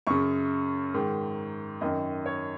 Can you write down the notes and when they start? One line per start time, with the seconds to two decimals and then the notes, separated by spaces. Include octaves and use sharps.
0.07 F#2 C#3 C#6
0.94 G#2 D#3
1.81 F#2 D#3 D#5
2.26 C#5